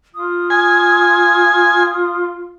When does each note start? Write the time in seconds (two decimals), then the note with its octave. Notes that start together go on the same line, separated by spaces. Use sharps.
0.15 F4 D#6
0.50 G#5